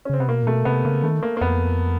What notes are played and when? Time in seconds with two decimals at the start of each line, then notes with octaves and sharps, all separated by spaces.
0.05 C#4
0.09 C#3 C4
0.20 C3 B3
0.28 B2 A#3
0.43 A#2
0.47 B2 A3
0.65 C3 B3
0.85 C#3 A#3
1.03 D#3 A3
1.23 A#3
1.37 A#3
1.41 F2 B3